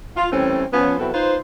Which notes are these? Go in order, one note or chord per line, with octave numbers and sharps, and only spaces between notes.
F4
E3 G3 A3 C4 C#4
F3 B3 C#4
B2 F#3 C4 E4 A4 B4
D#4 F4 B4 C5